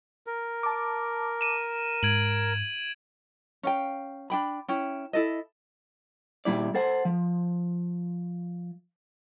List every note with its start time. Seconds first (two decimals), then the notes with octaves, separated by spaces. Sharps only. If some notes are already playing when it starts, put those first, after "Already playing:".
0.27 A#4
0.63 A5 D6
1.41 D#7 E7
2.03 G#2 G#6 D7 F#7
3.63 C#4 F5 G5
4.30 D4 G5 B5
4.69 C#4 E4 G5
5.13 E4 A4 D#5
6.45 A#2 G3 E4 D5
6.75 A4 C5 F#5
7.05 F3